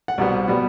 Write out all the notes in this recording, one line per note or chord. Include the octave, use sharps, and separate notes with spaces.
F#5
C2 B2 G3 B3
B2 G3 B3